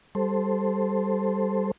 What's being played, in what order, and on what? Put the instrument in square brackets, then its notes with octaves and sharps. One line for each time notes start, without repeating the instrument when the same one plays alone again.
[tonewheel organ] G3 A4 C5